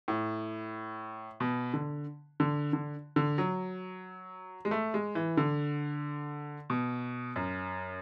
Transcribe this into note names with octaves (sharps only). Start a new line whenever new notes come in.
A2
B2
D3
D3
D3
D3
F#3
G#3
A3
G#3
E3
D3
B2
F#2